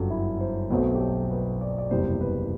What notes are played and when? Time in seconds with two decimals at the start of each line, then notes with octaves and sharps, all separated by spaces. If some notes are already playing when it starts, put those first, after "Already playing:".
Already playing: G1 F#2 D3 F#3 G4 A4
0.10 E4
0.41 C5
0.70 B1 B2 F#3 A3 C4 B4
0.95 G4
1.01 A4
1.30 B4
1.61 D5
1.78 D5
1.90 F#1 E2 C3 G3 C5
2.21 B4